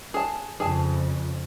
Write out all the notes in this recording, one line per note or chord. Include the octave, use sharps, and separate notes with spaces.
G#4 A5
F2 C#3 G#4 G#5 A5